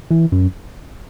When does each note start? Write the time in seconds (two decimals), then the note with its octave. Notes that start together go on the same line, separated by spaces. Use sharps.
0.11 E3
0.32 F#2